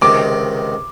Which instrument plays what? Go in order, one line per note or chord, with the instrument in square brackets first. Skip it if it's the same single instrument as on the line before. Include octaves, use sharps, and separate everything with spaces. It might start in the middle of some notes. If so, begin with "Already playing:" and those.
[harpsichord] C#2 C3 D#3 [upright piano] D6